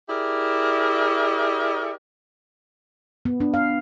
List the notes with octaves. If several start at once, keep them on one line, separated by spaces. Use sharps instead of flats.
E4 G4 G#4 A#4 D5 E5
B3
D4
F5